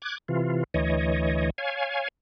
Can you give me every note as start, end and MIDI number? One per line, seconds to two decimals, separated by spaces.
0.02 0.18 86
0.02 0.18 90
0.02 0.18 92
0.28 0.64 48
0.28 0.64 52
0.28 0.64 65
0.74 1.50 38
0.74 1.50 52
0.74 1.50 73
0.74 1.50 75
1.58 2.08 73
1.58 2.08 77
1.58 2.08 80